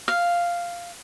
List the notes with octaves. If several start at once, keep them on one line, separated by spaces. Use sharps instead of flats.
F5